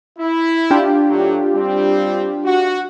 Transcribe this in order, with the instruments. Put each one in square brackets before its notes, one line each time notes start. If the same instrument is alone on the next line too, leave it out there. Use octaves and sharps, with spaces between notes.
[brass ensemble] E4
[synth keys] D4 F4 G4
[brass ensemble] A2 F#3
G3 C4
F#4